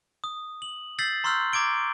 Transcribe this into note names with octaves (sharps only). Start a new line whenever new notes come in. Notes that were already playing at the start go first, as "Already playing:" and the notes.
D#6
F#7
E6 G6 A6 B6 C7 F#7
A#5 C6 C#6 E6 F6 G6
A#5 D6 G#6 D7 G7